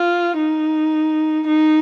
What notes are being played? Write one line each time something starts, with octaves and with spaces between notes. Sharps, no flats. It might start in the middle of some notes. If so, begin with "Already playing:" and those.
Already playing: F4
D#4
D#4